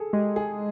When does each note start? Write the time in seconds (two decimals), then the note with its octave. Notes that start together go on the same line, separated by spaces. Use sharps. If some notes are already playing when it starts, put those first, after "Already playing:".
Already playing: G#4 A4
0.13 G#3 G4
0.36 G#4